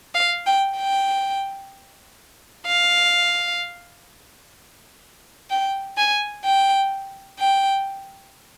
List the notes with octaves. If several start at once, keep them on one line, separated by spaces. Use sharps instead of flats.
F5
G5
G5
F5
G5
G#5
G5
G5